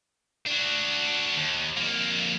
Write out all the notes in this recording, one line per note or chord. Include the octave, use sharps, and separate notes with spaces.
D4 F#4
D#2
F2 A#3